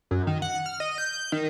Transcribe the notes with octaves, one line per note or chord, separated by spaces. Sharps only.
F#2
D#3
F#5
F6
D#5
G6
D#3